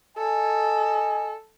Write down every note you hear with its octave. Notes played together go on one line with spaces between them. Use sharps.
A4 D#5 G#5